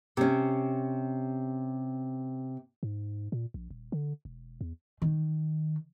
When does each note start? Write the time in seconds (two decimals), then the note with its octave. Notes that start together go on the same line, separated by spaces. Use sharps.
0.17 C3 C#4
2.83 G#2
3.32 A#2
3.54 A#1
3.70 D#1
3.92 D3
4.25 E1
4.61 E2
5.02 D#3